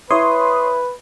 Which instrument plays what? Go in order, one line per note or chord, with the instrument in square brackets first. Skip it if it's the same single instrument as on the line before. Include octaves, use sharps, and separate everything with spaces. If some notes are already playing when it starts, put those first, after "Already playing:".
[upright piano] E4 [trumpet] B4 [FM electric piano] C#5 C6 D#6